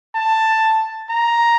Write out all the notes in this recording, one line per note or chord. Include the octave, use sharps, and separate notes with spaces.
A5
A#5